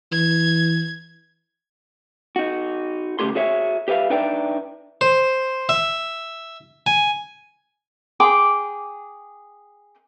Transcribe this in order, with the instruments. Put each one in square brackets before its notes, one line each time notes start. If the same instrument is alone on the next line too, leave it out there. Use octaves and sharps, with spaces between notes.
[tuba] E3 [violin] G#6
[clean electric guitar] D#4 F#4
C#2 C#3 A3 G4 G#4 C6
F#4 G#4 C#5 E5
G4 B4 E5 F5
D4 D#4 B4 D5 E5 G5
[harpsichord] C5
E5
G#5
[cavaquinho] G#4 G5 C6 D6